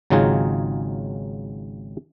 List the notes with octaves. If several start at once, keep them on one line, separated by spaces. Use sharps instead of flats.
G#1 C#3 F#3 D#4 F4 G#4